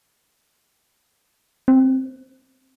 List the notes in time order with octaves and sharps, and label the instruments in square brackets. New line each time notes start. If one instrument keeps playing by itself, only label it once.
[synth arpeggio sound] C4